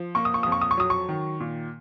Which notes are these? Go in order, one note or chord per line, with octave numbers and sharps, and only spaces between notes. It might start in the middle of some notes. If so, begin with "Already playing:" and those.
Already playing: F3
A#3 C#6
D#6
C#6
F2 D#6
C#6
D#6
C#6
F#3 D#6
C#6
D#3
A#2